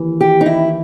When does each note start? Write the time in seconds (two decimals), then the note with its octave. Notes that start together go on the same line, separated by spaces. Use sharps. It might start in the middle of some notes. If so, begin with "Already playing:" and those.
Already playing: D#2 E3
0.21 G4
0.41 D#4
0.46 E4